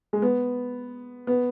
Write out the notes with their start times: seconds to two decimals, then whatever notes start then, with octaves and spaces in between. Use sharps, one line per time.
0.13 G#3
0.22 B3
1.27 B3